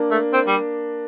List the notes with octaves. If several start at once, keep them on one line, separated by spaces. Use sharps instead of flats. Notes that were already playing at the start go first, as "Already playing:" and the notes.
Already playing: A#3 D4
A3
C4
G3